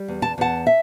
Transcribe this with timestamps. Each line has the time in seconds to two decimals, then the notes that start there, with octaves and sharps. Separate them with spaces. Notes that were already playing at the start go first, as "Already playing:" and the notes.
Already playing: G3
0.08 E2
0.22 A5
0.38 E2 F#5 A5
0.67 E5